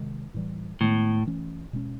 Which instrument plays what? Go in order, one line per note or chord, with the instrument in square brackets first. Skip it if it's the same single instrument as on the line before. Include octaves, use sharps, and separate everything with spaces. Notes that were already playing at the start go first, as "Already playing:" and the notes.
Already playing: [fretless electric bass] C3 D#3 G#3
A2 E3 G3
[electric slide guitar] A2 [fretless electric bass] D#3 G#3 B3
[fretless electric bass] E3 A3 C#4
B2 G#3 C#4